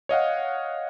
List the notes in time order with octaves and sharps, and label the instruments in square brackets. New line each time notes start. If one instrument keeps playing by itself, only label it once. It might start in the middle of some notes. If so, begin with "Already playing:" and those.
[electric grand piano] C#5 D#5 F5 F#5